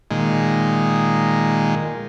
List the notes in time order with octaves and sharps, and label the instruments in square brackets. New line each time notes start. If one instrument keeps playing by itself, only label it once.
[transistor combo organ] A#2 D#3 G#3